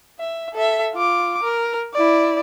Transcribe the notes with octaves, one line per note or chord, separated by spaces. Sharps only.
E5
A4 E5
F4 D6
A#4
E4 D5